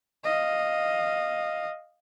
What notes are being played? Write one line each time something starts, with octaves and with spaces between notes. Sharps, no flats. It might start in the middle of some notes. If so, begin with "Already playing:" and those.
D#5 F5